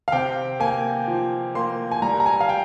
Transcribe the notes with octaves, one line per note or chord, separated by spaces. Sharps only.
F5
C3 G5
A#3 G#5
F3
A#3 C6
G#5
G3 A#5
A#5
G#5
F5
G5